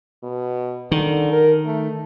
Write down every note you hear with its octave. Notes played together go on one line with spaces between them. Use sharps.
B2
D3 D#3
A#4
A3